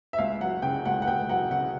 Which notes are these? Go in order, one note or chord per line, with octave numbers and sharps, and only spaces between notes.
E5
C#2 F5
F#3 F#5
C#3 G5
C#2 F#5
F#5
C#2 G5
F#3 F#5
C#3 F#5